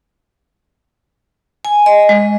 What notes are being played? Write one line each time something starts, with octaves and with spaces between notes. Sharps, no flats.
G#5
D#5
G#3